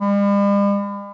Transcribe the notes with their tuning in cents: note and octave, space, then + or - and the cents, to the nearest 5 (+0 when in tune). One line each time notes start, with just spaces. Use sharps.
G3 +45